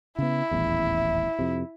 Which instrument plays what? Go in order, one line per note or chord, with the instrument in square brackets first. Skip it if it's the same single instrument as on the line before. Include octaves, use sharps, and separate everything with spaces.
[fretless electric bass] C#3 B3 [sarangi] E4
[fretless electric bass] D#1 A1 E2
F2 C3